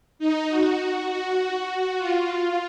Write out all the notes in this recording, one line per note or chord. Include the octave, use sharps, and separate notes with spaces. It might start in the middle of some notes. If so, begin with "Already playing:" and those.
D#4
F#4
F#4
F4